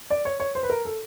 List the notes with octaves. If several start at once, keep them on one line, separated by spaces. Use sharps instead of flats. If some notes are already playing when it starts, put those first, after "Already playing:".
D5
C#5
C#5
C5
B4
A#4
A4